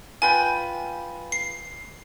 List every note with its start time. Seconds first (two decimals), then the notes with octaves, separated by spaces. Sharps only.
0.22 F4 B4 G5 G#5
1.32 C7